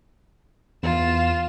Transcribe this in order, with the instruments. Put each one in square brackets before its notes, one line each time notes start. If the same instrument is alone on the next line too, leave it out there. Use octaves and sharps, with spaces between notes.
[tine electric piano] E2 [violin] F4 E7